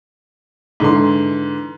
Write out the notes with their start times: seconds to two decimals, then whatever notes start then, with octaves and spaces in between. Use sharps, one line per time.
0.80 G#2 D3 E3 C6